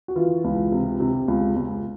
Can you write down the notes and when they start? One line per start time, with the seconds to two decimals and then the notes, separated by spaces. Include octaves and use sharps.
0.08 F#4
0.16 E3 F4
0.44 C#2
0.72 C3
1.00 C3
1.28 C#2
1.56 C#2